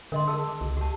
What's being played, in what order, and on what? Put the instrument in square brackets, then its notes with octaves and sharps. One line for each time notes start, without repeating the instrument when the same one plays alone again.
[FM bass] D3 [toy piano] A#4 D#5 C6
[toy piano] G#4 A5 E6
D6
[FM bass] C#2
[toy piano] G4 A5